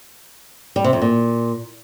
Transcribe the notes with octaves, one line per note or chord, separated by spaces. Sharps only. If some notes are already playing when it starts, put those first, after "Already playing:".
G3
C3
F2
A#2